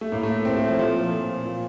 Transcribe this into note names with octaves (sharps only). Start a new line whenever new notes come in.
A3
A2 A#3
A3
A2 C4
A3
F3
A#2 F3
A#2
A#2